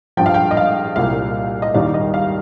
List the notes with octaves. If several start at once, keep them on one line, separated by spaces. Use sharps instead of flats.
G2 F3 G5
F5
G5
D#5
F5
C2 A#2 G3 F5
D#5
D#2 D#3 G3 F5
D#5
F5